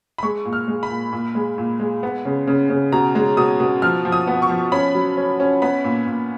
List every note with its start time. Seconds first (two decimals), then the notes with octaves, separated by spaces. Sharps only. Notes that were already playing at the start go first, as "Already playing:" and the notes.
0.18 B5
0.23 G#3 C#6
0.45 A#2
0.53 F6
0.68 G#3
0.83 B5
0.90 A#2
1.13 A#2
1.35 G#3
1.58 A#2
1.80 G#3
2.03 B3
2.25 C#3
2.47 C#3
2.70 C#3
2.92 B2 A#5
3.15 G#3
3.37 B2 D#6
3.60 B2
3.82 F3 F6
4.05 F3
4.12 D#6
4.27 B3
4.42 C#6
4.49 F3
4.72 C#4 B5
4.95 F#3
5.17 C#4
5.40 C#4
5.62 B3 B5
5.84 A#2
6.07 A#2